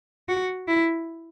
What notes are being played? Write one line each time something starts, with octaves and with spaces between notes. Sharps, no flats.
F#4
E4